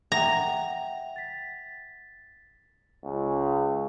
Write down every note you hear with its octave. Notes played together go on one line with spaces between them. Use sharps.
E5 F#5 G5 A#5
A6 B6
C#2